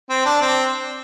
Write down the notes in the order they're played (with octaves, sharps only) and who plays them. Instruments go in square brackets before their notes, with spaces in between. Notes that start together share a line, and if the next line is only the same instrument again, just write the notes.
[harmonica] C4
D4
C4